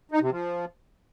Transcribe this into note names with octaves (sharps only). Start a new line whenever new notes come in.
D#4
C3
F3